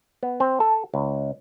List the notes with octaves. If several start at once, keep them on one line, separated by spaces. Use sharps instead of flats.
B3
C4
A4
C#2